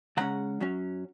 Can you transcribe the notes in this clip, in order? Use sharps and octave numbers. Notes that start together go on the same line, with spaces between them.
C#3 G#3 C#4 F#5 A#5
F#2 F#3 C#4